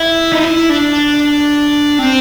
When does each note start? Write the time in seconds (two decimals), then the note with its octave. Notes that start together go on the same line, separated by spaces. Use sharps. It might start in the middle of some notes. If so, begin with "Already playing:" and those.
Already playing: E4
0.32 D#4
0.43 E4
0.70 D4
1.99 C4